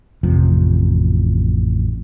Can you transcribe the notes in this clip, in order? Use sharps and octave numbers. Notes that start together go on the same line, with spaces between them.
A1 F2 C3 F3